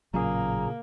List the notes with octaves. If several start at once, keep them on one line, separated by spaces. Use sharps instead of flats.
A1 A#2 C#3 F#3 A#3 G#4 A#5